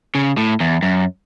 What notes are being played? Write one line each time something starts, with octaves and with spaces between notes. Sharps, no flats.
C#3
A2
E2
F#2